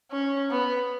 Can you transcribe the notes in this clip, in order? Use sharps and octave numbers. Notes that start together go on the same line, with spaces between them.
C#4
B3